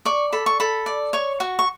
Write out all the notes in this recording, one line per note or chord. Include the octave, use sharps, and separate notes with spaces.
D5 C#6
A4 B5
C#6
A4 B5
D5
C#5 C#6
F#4 C#6
C#6